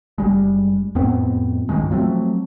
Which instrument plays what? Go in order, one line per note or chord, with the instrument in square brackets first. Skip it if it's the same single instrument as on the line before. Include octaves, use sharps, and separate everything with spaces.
[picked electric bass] F#1 G3 G#3
F2 A2 B3 C4
C#2 G2 D#3 G#3
F3 F#3 A3 C4